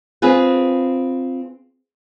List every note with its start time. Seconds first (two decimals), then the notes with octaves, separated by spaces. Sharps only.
0.22 C4 F4 G#4 B4